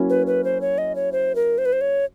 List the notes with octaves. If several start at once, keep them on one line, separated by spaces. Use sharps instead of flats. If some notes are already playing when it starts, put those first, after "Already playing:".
Already playing: F#3 A#3 C#4 E4
B4
B4
C5
C#5
D#5
C#5
C5
A#4
C5
B4
C5
C#5